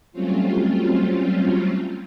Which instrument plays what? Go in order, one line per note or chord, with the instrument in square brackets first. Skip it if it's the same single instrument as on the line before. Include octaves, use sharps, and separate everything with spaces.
[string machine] F#3 G3 A3 C4 C#4 F4